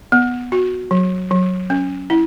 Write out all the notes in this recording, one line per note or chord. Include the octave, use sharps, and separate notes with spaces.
B3
F#4
F#3
F#3
C#4
E4